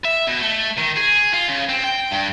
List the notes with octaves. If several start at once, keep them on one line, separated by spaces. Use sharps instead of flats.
E5
B2
A3
D#3
G#4
F4
C#3
C4
G5
G2